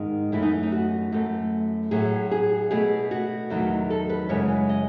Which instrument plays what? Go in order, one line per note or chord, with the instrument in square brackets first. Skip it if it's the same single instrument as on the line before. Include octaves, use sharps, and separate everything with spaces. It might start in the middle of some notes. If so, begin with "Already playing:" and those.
Already playing: [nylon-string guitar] G#2 D#3 G#3
F#2 E3 A3 E4
D#4
D#4
F#4
F#2 E3 A3
A2 F#3 A3 G#4
G#4
B2 A3 G#4
F#4
E2 D#3 F#3 A3
A4
B4
F#2 C#3 E3 G#3 C#5
D#5